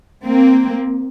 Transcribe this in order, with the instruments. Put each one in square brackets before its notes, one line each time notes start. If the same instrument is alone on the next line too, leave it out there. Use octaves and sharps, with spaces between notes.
[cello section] A#3 C4